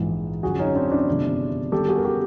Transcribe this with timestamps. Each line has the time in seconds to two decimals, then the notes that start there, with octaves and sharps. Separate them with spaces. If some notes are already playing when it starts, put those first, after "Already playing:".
Already playing: A#1 G#2 E3 G#3
0.43 F#2 D3 F3 F#4 G#4
0.59 C#4 D#4
0.75 C4 D4
0.91 D4 E4
1.08 G1 F2 C3 D#3 G#3
1.72 G1 G2 D#3 G3 G4 A4
1.88 F#4 G#4
1.97 A#4
2.05 G4 A4